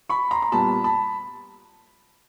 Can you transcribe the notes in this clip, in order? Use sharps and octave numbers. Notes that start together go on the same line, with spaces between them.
B5 C#6
A#5 C6
A#5
A#2 G3 B3 A5 B5
A5 B5